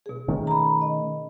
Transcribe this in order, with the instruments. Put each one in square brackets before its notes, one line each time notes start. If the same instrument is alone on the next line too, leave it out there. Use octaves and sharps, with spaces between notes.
[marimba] B2 G#4
[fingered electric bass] D#3 A3 C#4
[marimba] A#5 B5
D#5